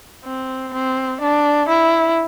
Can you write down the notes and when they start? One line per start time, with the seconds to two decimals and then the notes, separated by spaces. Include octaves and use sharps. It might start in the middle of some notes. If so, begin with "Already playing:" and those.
0.25 C4
0.73 C4
1.21 D4
1.69 E4